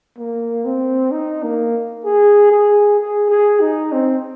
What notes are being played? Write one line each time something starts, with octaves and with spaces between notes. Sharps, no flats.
A#3
C4
D#4
A#3
G#4
G#4
G#4
G#4
D#4
C4